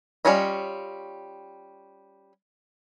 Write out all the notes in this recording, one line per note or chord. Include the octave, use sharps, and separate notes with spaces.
G3 C#4 F4 C#5 D#5